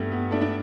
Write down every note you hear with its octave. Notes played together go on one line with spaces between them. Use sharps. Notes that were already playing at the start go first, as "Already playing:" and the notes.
Already playing: G2 G3 A3 B3
B3
A3 D4
D4